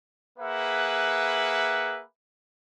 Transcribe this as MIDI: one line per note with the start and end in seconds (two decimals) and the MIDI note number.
0.39 2.02 58
0.39 2.02 68
0.39 2.02 71
0.39 2.02 76
0.39 2.02 78